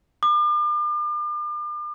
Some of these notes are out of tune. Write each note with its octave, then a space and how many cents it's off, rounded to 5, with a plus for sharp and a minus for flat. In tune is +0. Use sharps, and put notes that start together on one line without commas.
D6 +40